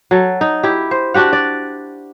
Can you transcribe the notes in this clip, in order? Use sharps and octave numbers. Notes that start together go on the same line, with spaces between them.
F#3 A4
D#4
E4 G4
C5
D4 F#4 G4 F#5
D5